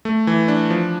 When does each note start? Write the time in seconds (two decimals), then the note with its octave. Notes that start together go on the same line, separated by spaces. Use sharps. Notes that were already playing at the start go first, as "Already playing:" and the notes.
0.05 A3
0.27 E3
0.48 D4
0.70 F3